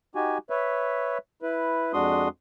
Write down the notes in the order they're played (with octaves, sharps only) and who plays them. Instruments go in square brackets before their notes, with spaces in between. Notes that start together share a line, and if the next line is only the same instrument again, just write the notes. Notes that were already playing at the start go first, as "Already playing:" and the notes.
[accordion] D#4 F#4 G4 G#5
B4 C#5 E5
E4 B4
F2 G#3 D4 F#4 C6 D#6